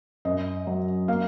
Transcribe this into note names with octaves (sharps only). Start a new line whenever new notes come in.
F#2 D#5
F#3
A#3 F5